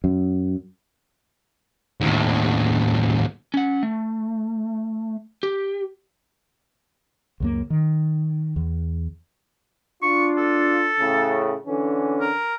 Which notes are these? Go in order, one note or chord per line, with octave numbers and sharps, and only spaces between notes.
F#2
D#2 A2
C#4 F#5
A3
G4
C#2 F#2 A#3
D#3
E2
D4 F4 C#6
A4
A2 C#3
D3 E3 C#4
A#4